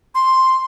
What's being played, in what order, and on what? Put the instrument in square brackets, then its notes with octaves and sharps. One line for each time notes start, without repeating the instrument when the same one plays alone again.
[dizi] C6